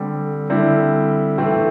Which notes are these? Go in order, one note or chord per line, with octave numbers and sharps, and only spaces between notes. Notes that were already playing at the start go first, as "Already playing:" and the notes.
Already playing: D3 G3 C4
D3 G3 C4 E4
A2 E3 A3 C4